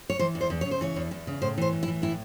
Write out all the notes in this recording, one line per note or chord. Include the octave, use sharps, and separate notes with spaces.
C#5
E3 C5
E2
C5
E2
C#3 C#5
C5
E3 C#5
E2
E2
C#3
A2 C5
E3 C5
A2
E4
E3
A2 E4